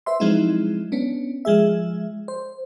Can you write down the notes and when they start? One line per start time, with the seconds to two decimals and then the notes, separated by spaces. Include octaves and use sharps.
0.06 B4 C5 E5 C6
0.20 F3 F#3 G#3 C4 D#4 E4
0.92 B3 C#4 D4
1.45 F3 G#3 G#4 E5
2.28 C5